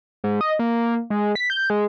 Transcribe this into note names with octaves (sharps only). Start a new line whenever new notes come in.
G#2
D#5
A#3
G#3
B6
G6
G#3